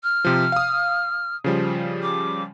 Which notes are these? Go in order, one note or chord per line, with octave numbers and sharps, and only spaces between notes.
F6
C3 F3
F5 D#6
C#3 F3 G3
D6